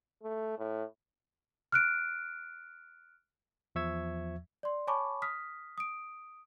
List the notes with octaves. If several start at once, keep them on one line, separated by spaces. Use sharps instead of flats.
A3
A2
F6 F#6 D7
E2 F3 E5 C#6 E6 G#6
D5 C6
C#5 G#5 A5 B5 C#6 D6
D#6 F6 B6
D#6 D7